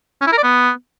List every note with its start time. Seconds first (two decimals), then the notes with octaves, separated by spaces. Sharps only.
0.21 C#4
0.27 E4
0.32 A#4
0.38 D5
0.43 B3